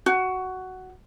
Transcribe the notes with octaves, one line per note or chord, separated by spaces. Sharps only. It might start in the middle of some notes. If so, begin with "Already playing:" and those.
F#4